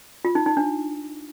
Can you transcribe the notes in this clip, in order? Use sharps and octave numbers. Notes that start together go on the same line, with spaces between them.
F4
D#4
D#4
D4